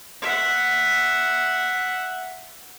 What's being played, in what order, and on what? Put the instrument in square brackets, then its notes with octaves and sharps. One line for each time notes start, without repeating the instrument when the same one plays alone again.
[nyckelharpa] E5 F#5